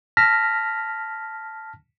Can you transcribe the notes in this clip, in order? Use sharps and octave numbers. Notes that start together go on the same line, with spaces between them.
A5 F6 A#6 B6